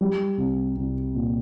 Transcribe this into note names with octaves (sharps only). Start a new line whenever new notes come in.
G3
C2
C2
A#2